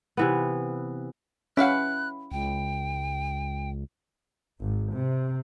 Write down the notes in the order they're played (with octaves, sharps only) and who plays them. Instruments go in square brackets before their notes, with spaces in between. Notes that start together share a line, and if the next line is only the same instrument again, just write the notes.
[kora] C3 E3 B3
[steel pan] C#4 F#5 [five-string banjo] E4 B4 F5 [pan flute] F#6
[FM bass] C#2 [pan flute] G5
[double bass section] G#1
C3